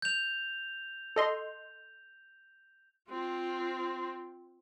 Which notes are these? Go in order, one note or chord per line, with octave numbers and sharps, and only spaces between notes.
G6 F7
A4 D#5 C6
C4 F4